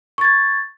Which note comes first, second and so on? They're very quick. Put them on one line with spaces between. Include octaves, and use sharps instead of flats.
C#6 A6 G#6